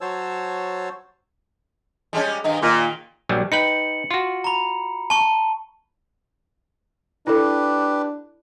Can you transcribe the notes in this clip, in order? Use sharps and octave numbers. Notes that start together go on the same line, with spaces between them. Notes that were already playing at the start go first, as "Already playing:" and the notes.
F#3 F#4 C5 C#5 A5 E6
G3 G#3 C#4
G2 D#3 D#4
A#2 D#3
A#1 F#3 G3
D#4 B4 G5 C#7 F#7
F4 F#4
A#5 B5
A5 C#6
D4 E4 G4 A4 B4